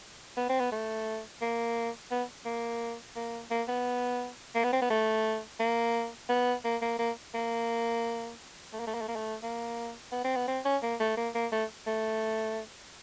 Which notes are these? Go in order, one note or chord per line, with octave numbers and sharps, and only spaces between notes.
B3
C4
B3
A3
A#3
B3
A#3
A#3
A#3
B3
A#3
B3
C4
B3
A3
A#3
B3
A#3
A#3
A#3
A#3
A3
A#3
A3
A#3
A3
A#3
A3
A#3
B3
C4
B3
C4
C#4
A#3
A3
A#3
A#3
A3
A3